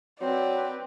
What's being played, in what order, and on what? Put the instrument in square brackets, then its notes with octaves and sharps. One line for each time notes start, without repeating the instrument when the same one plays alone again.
[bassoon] F#3 [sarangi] C4 [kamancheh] B4 D5